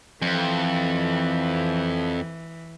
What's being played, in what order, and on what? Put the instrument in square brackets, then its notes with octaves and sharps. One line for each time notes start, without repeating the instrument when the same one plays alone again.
[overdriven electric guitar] F2 [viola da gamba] E3